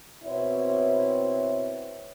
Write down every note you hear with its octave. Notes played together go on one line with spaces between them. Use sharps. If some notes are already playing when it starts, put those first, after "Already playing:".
B2 C4 E4 C#5